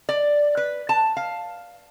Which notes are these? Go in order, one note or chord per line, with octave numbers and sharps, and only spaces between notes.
D5
B4
A5
F5